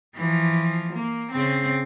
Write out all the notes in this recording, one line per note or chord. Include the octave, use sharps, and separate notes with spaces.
E3 F3
A#3
C#3 C4